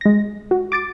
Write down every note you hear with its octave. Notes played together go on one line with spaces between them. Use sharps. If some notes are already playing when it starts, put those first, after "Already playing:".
G#3 A#6
F#4
D6 A6 D7